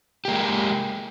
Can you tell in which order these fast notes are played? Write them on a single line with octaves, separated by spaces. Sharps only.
G4 A#3 G#3